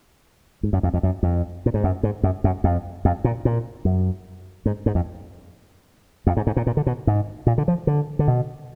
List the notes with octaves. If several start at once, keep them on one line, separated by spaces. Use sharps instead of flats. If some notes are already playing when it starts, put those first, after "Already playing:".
G#2
F#2
F2
F2
F#2
F2
A#2
G#2
F#2
G#2
F#2
F#2
F2
F2
A#2
A#2
F#2
G#2
G#2
F2
F2
G#2
G#2
A#2
A#2
D3
B2
G#2
A#2
D3
F3
D3
D3
B2